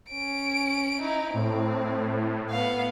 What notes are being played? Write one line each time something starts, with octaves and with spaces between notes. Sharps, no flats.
C#4 D7
D#4 E4
A2 C4
B3 F5